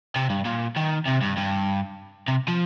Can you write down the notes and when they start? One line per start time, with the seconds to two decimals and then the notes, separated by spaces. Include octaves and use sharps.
0.16 C3
0.30 G2
0.45 A#2
0.76 D#3
1.06 C3
1.21 G2
1.36 G2
2.28 C3
2.48 F3